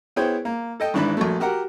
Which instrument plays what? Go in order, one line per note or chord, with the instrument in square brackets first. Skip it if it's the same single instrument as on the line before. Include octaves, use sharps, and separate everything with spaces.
[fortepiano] B3 E4 G#4 C5 C#5 G5
A#3
A4 D#5 G5
G#1 G#2 E3 D4 B5
A#1 F#3 A3
F#4 G4 A#4 F#5